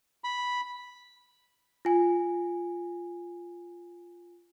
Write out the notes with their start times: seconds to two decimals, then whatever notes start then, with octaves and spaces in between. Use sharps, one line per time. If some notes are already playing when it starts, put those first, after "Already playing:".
0.24 B5
1.85 F4 G#5